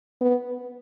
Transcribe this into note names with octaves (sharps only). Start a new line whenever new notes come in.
B3